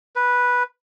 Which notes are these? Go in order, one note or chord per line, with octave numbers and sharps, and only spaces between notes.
B4